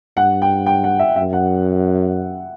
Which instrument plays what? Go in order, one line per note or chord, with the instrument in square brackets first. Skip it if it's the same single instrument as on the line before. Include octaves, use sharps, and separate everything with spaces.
[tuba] G2 [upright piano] F#5
[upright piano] G5
G5
F#5
E5
[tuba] F#2 [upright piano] E5
[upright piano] F#5